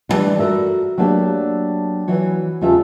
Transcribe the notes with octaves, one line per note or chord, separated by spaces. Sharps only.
D3 E3 G3 A3 D4
F#4 A4 A#4 E5
F#3 A3 A#3 D4 G4
E3 F#3 C#5
E2 C#3 F4 G4 E5 A5